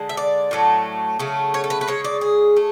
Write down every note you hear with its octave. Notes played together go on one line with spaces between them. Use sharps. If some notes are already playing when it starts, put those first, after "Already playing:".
Already playing: D3 G#3
E5
D5
A2 F#3 A3
C#3 F#3 A3
C#5
A4
B4
B4
C#3 G#3 C#5
D5
G#4
A3